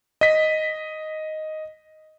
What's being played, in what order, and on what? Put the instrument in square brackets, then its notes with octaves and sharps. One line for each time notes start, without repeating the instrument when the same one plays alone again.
[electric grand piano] D#5 B6